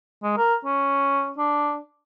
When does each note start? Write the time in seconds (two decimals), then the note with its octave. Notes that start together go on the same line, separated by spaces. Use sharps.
0.23 G#3
0.38 A#4
0.65 C#4
1.38 D4